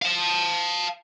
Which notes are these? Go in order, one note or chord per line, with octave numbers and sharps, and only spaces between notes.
F5 A5